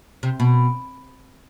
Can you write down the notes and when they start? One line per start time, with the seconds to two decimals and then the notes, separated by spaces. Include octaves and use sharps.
0.23 C3
0.40 B2